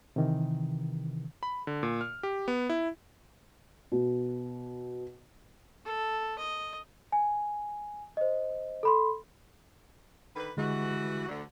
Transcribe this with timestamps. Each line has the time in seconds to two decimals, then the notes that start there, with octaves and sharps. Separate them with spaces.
0.16 C3 D#3 E3
1.43 B5
1.67 D3
1.83 A#2
2.01 F6
2.23 G4
2.48 B3
2.69 E4
3.92 B2
5.85 A4
6.38 D#5
7.12 G#5
8.17 C5 D#5
8.83 A4 B5 C6
10.35 D3 D#3 B4
10.57 G2 D3 E3 G#3 F#4
11.28 D2 D3